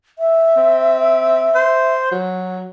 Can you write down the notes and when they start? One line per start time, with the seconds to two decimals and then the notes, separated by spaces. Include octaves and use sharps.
0.19 E5
0.57 C4
1.55 C5
2.12 F#3